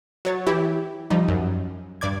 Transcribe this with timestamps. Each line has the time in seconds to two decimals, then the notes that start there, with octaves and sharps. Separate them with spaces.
0.25 F#3 C#5 A6
0.47 E3 E4 G4
1.10 F3 G3 D#4
1.28 F#2
2.01 G2 D5 D6 G#6